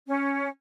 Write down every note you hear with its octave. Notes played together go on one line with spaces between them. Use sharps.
C#4